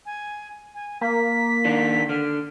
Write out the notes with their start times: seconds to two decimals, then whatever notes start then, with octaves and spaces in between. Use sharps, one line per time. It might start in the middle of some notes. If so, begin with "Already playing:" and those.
0.06 G#5
0.75 G#5
1.01 A#3 B6
1.65 D#3 D4
2.09 D3 F6